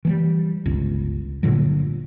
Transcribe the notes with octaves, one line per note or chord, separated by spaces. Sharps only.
E3 F#3 G3
G1 C#2
G1 A#2 D3 F#3